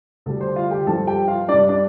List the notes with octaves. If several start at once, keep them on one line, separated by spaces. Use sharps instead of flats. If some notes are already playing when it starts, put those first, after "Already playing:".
D2 D3 G3 A4
C5
F4 F5
G4 G5
G2 F3 A4 A5
G4 G5
F4 F5
G2 G3 D4 D5
D4 D5